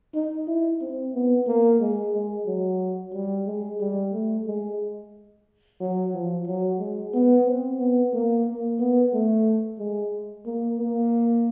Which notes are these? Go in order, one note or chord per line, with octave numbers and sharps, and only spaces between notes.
D#4
E4
C4
B3
A#3
G#3
G#3
F#3
G3
G#3
G3
A3
G#3
F#3
F3
F#3
G#3
B3
C4
B3
A#3
A#3
B3
A3
G#3
A#3
A#3